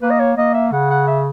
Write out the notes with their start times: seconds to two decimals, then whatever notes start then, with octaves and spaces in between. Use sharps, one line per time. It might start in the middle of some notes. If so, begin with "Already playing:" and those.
0.02 A#3 B4
0.10 D#5
0.19 C#5
0.37 A#3 D#5
0.54 E5
0.72 C#3 F#5
0.90 F#5
1.07 E5